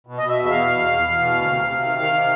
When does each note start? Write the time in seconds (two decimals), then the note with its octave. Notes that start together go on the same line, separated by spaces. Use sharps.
0.07 B2
0.18 D#5
0.23 B2 E5
0.39 E2
0.45 E5
0.50 B2 F5
0.70 E2
0.86 E2
1.02 E2
1.19 B2
1.34 D2
1.50 C3
1.66 C3
1.82 D#3
1.97 D#3 F5
2.13 C3